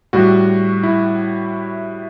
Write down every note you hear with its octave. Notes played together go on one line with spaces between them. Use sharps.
A2 G3 F#4
E4